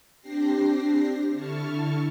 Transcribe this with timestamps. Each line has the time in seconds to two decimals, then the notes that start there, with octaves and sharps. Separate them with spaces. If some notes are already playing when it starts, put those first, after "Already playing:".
0.20 C4 D4 G4 A#6 C7
1.32 D3 E4 A5 C#6 F6